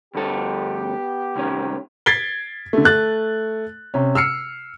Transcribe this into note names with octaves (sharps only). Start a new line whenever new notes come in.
D2 G2 B3 G4 A4
C2 D#3 C#4
G#6 A6 B6 C7 D7 G7
D3 A3
A3 F#6 A6
C3 C#4
E6 F6 C7 C#7